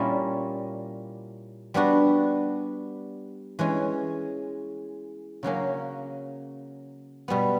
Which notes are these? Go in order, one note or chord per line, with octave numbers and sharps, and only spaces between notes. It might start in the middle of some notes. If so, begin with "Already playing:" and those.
Already playing: A#2 G3 A#3 C#4 E4
G3 B3 D4 F#4
E3 G#3 C#4
C#3 F#3 A#3 C#4
B2 G3 B3